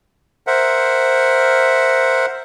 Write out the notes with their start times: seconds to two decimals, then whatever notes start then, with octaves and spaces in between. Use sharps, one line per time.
0.47 A#4 C5 E5 F#5